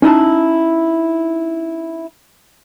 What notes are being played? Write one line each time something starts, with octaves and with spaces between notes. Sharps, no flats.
C#4 D#4 E4 A5